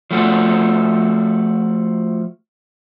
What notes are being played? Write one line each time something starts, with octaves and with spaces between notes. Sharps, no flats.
F3 A3 F#4